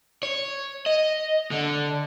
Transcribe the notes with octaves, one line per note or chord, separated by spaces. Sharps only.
C#5
D#5
D3